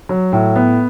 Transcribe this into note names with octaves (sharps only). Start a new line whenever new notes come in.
F#3
A2
B3